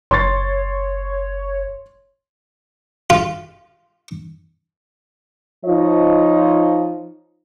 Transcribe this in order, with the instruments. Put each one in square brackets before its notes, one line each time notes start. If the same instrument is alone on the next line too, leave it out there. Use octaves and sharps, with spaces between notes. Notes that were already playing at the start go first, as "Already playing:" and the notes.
[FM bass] F#1 [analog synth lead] C#5 [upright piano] C6 C#6 A6
[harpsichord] F4
[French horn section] F3 D#4 F4 C#5 D#5